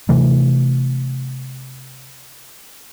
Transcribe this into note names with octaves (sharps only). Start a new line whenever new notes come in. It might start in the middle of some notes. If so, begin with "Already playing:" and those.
C3 E3 A3